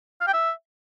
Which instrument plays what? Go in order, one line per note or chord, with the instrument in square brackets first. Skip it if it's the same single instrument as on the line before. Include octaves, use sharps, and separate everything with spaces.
[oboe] F5
G5
E5